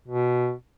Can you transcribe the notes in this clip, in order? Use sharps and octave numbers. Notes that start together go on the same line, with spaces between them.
B2